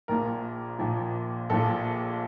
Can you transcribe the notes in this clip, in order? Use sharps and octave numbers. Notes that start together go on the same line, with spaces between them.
A#1 A#2 F3 A#4
A#1 A#2 F3
A#1 A#2 F3 A4